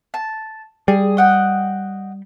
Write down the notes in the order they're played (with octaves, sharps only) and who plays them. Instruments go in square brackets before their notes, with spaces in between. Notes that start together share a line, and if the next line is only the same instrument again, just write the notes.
[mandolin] A5
[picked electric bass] G3 [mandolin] G#4
[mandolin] D#5 F#5 G5